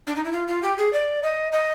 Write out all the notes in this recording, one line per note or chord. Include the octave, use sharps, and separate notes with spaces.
D4
D#4
E4
F4
F4
G4
G#4
D5
D#5
D#5